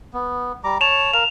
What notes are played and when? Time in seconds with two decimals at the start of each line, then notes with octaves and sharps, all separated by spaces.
0.13 B3
0.64 G3 A#5 D6
0.81 C#5 A5 E7 F7
1.13 A#4 F5 F7